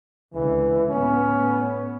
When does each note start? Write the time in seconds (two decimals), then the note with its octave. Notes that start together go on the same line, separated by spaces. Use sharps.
0.34 C#2 D3 E3
0.89 A2 B3 C#4